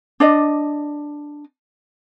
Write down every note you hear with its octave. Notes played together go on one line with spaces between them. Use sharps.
D4 D5 D#5